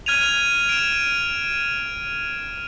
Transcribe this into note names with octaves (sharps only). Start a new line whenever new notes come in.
F6 G#6 D#7 F7
D7 E7